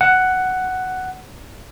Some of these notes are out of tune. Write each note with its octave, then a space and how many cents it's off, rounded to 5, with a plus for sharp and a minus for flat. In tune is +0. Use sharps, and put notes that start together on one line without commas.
F#5 +5